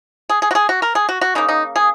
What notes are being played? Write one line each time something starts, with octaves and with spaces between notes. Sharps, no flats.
G#4
G#4
F#4
G#4
F#4
A#4
G#4
F#4
F#4
C#3 A#3 D#4
D#4
G#4